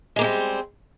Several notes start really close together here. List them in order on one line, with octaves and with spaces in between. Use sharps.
G#3 A#3 C4 G3